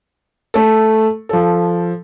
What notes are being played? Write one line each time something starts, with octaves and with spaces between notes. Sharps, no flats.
A3 A4
F3 A4